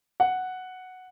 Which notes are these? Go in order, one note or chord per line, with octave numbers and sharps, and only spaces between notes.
F#5